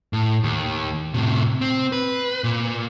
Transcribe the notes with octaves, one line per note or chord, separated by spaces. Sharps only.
A2
D#2
A2 C3
C4
B4
A#2